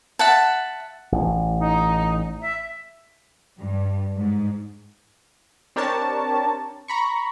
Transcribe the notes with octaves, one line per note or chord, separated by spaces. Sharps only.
E5 F#5 A5
A1
D#4
E5
G2
G#2
C4 D4 G4 A#4 C#5 A5
A#5 B5 C#6